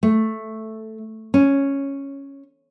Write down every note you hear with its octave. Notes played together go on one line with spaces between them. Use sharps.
A3
C#4